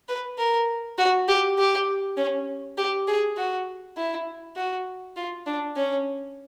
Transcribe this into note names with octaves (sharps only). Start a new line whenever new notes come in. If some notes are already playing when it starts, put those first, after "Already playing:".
B4
A#4
F#4
G4
G4
C#4
G4
G#4
F#4
E4
F#4
F4
D4
C#4